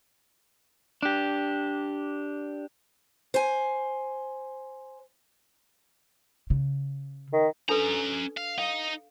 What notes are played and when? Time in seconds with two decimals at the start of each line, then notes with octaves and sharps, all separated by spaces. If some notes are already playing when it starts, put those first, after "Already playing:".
1.03 D4 G4
3.34 C5 G#5
6.50 C#3
7.33 D#3
7.69 C#4 D4 A4 B4 A#5
8.37 F5
8.58 D#4 F5